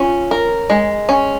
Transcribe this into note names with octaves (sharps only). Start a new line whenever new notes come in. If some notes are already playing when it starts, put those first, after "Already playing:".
Already playing: C#4 F4
A#4
G#3
C#4